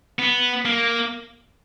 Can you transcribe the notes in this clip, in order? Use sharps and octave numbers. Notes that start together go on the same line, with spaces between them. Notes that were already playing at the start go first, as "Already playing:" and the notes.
B3
A#3